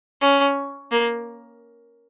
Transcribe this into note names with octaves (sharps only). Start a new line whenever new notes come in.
C#4
A#3